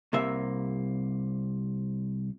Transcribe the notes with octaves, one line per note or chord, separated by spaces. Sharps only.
C2 C3 A#3 E5